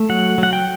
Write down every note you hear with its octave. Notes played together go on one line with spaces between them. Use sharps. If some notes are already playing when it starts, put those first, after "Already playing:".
Already playing: A3
F#3 F#5
F#3 F#5
G5